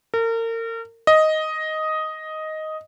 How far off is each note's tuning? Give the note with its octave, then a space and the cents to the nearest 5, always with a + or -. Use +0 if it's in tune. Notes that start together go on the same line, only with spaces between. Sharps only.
A#4 -35
D#5 +5